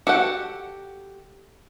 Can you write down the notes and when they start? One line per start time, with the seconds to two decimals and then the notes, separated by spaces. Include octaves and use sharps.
0.07 F#4 G4 A4 F#5